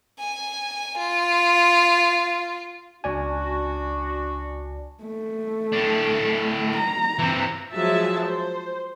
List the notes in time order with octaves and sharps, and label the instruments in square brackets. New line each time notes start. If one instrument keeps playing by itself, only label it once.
[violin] G#5
F4
[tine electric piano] C#2 D5 G#5 [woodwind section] D4 F#4
[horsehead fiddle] A3
[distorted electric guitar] A2 D4
[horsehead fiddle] A#5
[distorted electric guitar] E3 C4
[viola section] F3 F#3 G#3 G#4 E5 A5
C5